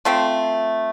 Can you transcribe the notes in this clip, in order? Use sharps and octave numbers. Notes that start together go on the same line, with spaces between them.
F3 A3 C4